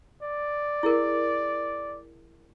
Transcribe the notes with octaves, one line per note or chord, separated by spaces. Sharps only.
D5
E4 G#4 A#4